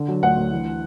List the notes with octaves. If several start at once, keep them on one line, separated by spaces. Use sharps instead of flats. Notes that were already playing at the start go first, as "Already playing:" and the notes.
Already playing: D3
F#3
D2 F#5
D2
E3